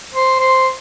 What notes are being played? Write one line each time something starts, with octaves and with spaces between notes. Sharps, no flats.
C5
C5